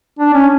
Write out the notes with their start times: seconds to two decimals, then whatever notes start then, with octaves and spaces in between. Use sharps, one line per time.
0.19 D4
0.34 C#4